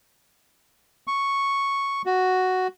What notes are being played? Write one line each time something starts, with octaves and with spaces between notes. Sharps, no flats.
C#6
F#4